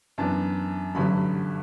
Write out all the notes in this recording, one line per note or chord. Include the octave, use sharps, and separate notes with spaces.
F#2 E3 B3 D4 A5
A1 G2 D3 F#3 B5